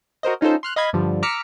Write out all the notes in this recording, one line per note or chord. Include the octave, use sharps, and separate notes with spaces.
F#4 A#4 C5 D#5
C#4 D#4 F4 A4 C5
C6 F6 F#6
D#5 F5 B5 G#6
G2 D3 F3 G3
A#5 D6 E6 F6 B6 C#7